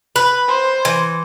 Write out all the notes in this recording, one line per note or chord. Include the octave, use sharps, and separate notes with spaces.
B4
C5
E3